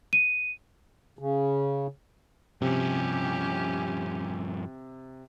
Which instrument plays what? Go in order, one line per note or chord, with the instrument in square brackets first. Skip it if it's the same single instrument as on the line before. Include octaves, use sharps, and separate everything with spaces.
[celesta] D#7
[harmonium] C#3
[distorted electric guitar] G2 F3 [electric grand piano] C3 [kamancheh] C#4 G4